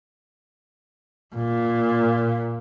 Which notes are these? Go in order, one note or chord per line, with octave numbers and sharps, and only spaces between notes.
A#2